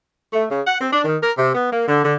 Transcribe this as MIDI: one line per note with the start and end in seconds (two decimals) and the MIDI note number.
0.33 0.45 57
0.50 0.61 49
0.66 0.76 78
0.80 0.88 60
0.93 1.02 62
1.05 1.16 51
1.22 1.31 70
1.37 1.50 48
1.55 1.70 59
1.71 1.83 58
1.87 2.02 50
2.04 2.15 50